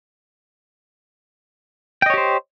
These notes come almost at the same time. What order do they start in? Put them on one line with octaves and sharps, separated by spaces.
G5 D#5 C#5 G4 C5